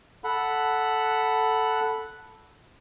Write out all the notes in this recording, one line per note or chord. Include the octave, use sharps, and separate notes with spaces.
A4 F#5 B5